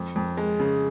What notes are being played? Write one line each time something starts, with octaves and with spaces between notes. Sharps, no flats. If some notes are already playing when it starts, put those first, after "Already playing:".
Already playing: F2
F2
G#3
C#3